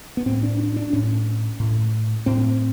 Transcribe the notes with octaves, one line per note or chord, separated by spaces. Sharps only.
B3
A2 C4
D4
D4
D4
A2 C#4
A2
A2 C4